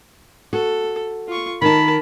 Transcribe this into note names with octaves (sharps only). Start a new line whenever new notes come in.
F#4 A4
F4 C#6
D#3 D#4 A#4 A5 B5